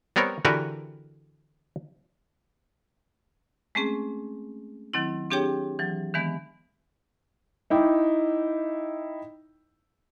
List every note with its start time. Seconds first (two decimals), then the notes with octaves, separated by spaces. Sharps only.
0.16 G3 B3 C4 A#4 C#5
0.45 D3 E3 F#4 G4 A#4 B4
3.75 G#3 A3 C4 C#4 G#4
4.94 D#3 F#3 C4 E4
5.31 C4 D4 G4 G#4 C#5 G5
5.79 E3 F#3
6.14 D#3 E3 G#3 B3
7.70 D#4 E4 G5 D6